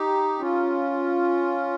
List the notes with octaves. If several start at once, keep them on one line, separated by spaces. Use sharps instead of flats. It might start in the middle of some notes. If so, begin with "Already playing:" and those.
Already playing: D#4 G4
C#4 F4